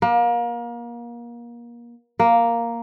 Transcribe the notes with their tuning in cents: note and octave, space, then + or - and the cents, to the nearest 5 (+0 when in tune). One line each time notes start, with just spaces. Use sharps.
A#3 +30
A#3 +0